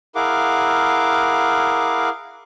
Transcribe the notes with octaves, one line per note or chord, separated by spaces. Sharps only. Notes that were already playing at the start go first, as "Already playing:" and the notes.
E4 G#4 A#4 F5 F#5 D6